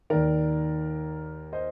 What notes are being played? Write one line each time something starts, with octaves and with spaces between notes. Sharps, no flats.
D#2 D#3 A#4 D5
C5 D#5